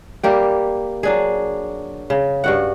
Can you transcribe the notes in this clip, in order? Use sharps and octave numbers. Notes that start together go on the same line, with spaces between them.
G3 A#3 G4
F#3 D4 G#4
C#3
G2 F#4 F#5